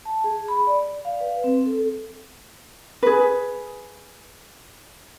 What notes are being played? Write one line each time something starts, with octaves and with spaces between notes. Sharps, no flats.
A5
G#4
B5
D5
F5
B4
C4
A4
G#4 B4